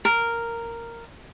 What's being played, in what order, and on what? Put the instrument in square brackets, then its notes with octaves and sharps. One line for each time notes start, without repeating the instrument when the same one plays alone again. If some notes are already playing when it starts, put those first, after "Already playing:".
[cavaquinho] A#4